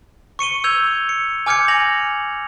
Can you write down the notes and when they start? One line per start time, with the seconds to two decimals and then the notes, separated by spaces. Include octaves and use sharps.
0.39 C#6 C#7 D#7 G7
0.64 E6 G6 G#6 F7
1.09 C#7
1.46 G#5 D6 F6 G6 G#6 C#7
1.68 G#5 A#6 F7 F#7